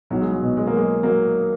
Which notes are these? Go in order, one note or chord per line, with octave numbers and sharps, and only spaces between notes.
B1 F#3
G#3
F#3
B2
G#3
A#3
F#3 G#3
F#3 A#3